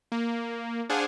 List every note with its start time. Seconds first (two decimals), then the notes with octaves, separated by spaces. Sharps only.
0.12 A#3
0.89 D4 G#4 C5 F5 F#5 G#5